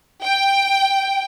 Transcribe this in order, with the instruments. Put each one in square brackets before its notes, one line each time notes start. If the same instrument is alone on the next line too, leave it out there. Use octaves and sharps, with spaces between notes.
[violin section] G5